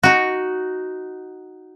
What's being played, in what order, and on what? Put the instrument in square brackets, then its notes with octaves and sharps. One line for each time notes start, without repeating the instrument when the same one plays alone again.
[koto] D#4 F#4